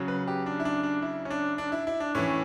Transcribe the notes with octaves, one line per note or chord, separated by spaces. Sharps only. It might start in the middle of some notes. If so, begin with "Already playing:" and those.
Already playing: C#3 F#3
B4
G4
D4
E4
D4
D4
E4
C#4
D4
D4
E4
E4
D4
A2 E3 C#4